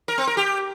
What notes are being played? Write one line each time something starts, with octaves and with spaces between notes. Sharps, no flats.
A#4
C4
A#4
G4